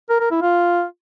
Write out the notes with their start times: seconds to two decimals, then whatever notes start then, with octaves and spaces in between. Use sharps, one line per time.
0.09 A#4
0.20 A#4
0.31 E4
0.42 F4